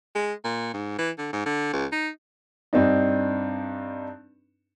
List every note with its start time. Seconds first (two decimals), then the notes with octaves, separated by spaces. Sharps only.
0.15 G#3
0.45 A#2
0.74 G#2
0.98 E3
1.18 D3
1.33 G#2
1.46 D3
1.73 C#2
1.92 D#4
2.73 G2 C4 D4 D#4